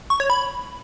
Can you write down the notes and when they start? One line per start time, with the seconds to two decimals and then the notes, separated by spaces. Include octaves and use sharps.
0.10 C#6
0.20 C#5
0.30 B5